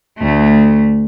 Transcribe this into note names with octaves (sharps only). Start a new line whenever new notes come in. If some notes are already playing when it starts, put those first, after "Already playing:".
D2 A3